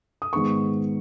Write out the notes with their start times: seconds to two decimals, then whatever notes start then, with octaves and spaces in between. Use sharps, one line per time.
0.22 D#6
0.33 G#2 D#3 G#3 B3 C#6